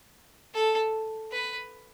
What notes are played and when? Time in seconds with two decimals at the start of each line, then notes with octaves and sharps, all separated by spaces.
0.54 A4
1.32 B4